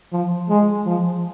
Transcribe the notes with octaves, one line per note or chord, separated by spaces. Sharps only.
F3
G#3
F3